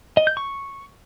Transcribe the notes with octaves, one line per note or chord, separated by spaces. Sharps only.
D#5
G6
C#6